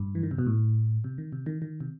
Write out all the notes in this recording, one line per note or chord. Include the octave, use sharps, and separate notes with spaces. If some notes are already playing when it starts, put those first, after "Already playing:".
Already playing: G2
E3
D#3
C3
B2
A2
C3
D#3
C3
D#3
D#3
C3